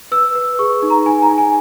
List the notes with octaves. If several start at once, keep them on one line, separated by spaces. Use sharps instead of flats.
B4 E6
B4
G#4 C#6
D#4
A#5
D#4 G#5
A#5
D#4
G#5